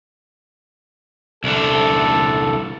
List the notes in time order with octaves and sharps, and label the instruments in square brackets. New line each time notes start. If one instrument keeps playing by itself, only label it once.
[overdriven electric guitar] C2 D3 [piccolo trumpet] A4